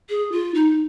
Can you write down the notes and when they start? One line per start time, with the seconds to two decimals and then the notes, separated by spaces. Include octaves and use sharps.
0.10 G#4
0.32 F4
0.55 D#4